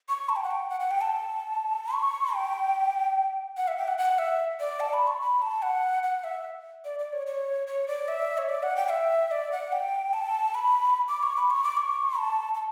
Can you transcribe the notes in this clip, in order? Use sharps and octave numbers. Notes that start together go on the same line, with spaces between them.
C#6
A5
G5
F#5
G5
F#5
F#5
G5
A5
C#6
G5
F#5
E5
G5
F#5
F#5
E5
D5
A5
B5
C#6
B5
A5
F#5
F#5
E5
D5
D5
C#5
C#5
C#5
D5
E5
C#5
D5
F#5
G5
E5
D5
F#5
G5
A5
B5
D6
C#6
B5
C#6
D6
C#6
A5
A5